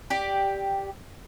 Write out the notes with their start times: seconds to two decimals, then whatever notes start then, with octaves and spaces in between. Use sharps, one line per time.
0.10 G4 D5